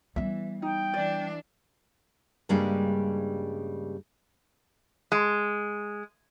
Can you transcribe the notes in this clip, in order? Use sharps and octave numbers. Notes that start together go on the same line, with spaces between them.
E3 G3 B3 E5
D#4 G5
E3 D4 D5
G2 C#3 G3 G#3 A#3 D4
G#3